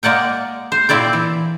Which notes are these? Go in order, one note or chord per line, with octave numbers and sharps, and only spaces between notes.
G#3 A#3 D5 F#5 G5
C5
A#2 C4 E4 D5 G5
E3